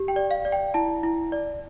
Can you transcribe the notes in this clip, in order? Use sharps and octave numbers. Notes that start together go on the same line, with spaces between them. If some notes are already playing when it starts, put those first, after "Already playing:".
Already playing: G4
G5
D5
F5
D5
G5
E4 A5
E4
D5